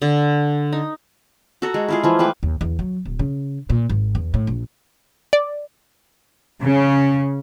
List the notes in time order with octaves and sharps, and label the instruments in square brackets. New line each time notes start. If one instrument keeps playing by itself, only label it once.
[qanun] D3
D#4
F#4 A4 F#5 A#5
G#3
E4 F4 G#4
E3 F3
G3 A3 F4 B4
[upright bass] D#2
E2
F#3
D#1
C#3
A#2
G#1
E2
A2
A#1
[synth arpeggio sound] D5
[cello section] C#3 C#4